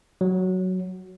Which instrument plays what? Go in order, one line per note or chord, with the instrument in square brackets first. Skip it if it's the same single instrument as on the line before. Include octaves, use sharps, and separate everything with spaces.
[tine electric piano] F#3